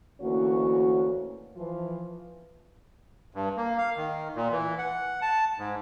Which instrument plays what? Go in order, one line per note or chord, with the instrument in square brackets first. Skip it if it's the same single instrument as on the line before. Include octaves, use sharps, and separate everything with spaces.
[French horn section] D2 E3 A#3 C#4 F#4 C#5
E3 F3 F4
[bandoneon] G2
A#3
F5
D#3
A#2
E3
F#5
A5
G#2